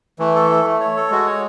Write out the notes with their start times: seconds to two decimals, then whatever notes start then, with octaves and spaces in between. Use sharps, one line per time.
0.19 E3 A3
0.35 A4
0.51 A3
0.65 A3
0.80 C#5
0.97 A4
1.11 G#3 F#4
1.26 C#5